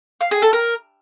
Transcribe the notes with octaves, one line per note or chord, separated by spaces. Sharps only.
F5
G#4
A4
A#4